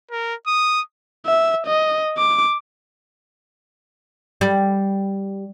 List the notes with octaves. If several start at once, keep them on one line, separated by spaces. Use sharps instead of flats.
A#4
D#6
E5
D#5
D6
G3